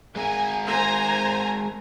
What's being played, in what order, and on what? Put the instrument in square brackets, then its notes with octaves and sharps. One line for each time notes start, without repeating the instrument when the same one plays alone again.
[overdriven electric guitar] G#3 A#4 [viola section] G#5
[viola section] C5 G#5 A#5